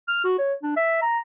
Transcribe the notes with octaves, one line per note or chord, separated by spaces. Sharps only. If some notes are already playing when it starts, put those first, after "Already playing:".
F6
F#4
C#5
D4
E5
A#5